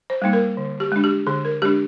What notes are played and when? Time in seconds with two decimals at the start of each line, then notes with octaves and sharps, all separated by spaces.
0.10 C5
0.22 G3 A#3 D#4
0.33 A#4
0.57 D3
0.80 G4
0.92 G#3 D4
1.04 G4
1.27 D3 G#4
1.45 A#4
1.62 G#3 D4 G4